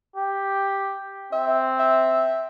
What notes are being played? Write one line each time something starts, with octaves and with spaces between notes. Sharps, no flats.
G4
C4 E5
E5